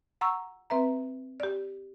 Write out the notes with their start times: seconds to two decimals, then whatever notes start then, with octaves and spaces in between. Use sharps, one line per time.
0.21 F#5 A#5 C#6 E6
0.70 C4 B4 E5 A#5
1.40 G4 D5